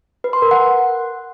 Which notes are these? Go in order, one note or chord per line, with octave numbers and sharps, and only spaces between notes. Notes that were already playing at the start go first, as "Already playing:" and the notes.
B4
C6
A#4
F#5